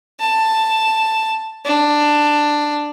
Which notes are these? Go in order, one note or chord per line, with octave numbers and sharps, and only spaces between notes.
A5
D4